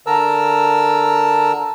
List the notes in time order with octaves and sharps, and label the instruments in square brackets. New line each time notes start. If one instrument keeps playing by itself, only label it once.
[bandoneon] D3 A#4 A5 A#5 E6